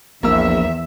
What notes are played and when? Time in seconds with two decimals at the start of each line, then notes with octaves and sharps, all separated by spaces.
0.23 A#1 E2 A#3 E5 E6